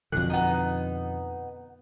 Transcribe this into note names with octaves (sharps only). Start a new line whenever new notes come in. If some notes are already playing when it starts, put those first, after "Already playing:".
F2 B2 D3 F#6
B3 D#4